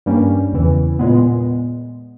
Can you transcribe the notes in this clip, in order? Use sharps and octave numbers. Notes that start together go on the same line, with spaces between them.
G2 G3 A#3 C#4
E2 C#3 E3
A#2 G#3 B3